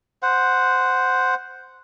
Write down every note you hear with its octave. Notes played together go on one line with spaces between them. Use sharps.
C5 F#5